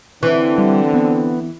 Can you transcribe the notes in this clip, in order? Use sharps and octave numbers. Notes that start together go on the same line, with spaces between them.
D3 E3 C4
G3
B3